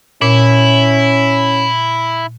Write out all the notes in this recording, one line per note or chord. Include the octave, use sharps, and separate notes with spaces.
A#2 C#4 E4